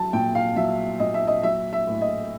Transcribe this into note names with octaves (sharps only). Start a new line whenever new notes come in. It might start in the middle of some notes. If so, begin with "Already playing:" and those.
Already playing: F#3 A5
A#2 G5
F5
F#3 E5
A#2 D#5
E5
D#5
F#3 E5
E5
A2
D#5